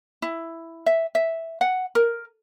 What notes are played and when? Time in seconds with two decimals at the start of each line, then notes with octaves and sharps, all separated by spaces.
0.22 E4
0.86 E5
1.15 E5
1.61 F#5
1.95 A#4